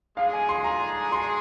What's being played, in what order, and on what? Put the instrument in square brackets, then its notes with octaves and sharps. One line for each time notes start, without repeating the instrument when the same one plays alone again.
[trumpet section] G#3 D4 G#4 [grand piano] F5
[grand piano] G#5
C6
A#5
C6